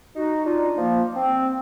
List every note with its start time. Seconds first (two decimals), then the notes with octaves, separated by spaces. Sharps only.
0.16 D#4 F#4
0.45 D4 D#4 F4
0.76 F3 A#3
1.15 C4